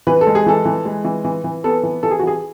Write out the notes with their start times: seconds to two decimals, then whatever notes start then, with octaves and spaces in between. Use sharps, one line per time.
0.07 E3 B4
0.21 A4
0.27 G#3
0.35 G#4
0.46 E3 A4
0.65 E3
0.85 G#3
1.04 E3
1.25 E3
1.44 E3
1.64 B3 A4
1.83 E3
2.03 E3 A4
2.11 G#4
2.19 F#4
2.23 E3 G#4